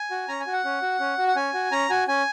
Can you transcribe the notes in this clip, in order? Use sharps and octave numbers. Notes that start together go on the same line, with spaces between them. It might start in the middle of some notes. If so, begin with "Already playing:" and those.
Already playing: G#5
F#4
C#4 A#5
G#5
F#4
F#5
C#4
F#4
C#4
F#4
F#5
C#4 G#5
F#4
C#4 A#5
F#4 G#5
C#4 G#5